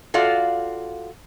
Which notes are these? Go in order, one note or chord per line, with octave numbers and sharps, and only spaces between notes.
F4 F#4 A4 D5 F5